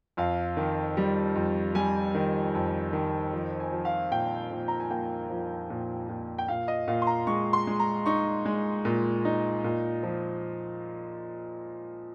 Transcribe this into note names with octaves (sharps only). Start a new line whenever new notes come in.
F2 F5
D#3
G3
F2
G3 G#5
D#3
F2
D#3
F3
G#5
F3
F5
A#2 G5
A#2
A#5
G#5
A#3 G5
F3
A#2
A#2
G5
A#2 F5
D#5
A#2 F5
C6
A#5
G#3 C#6
C6
G#3
A#5
D#4 C#6
G#3
A#2
D#4
A#2
F3